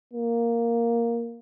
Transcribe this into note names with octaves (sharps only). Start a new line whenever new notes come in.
A#3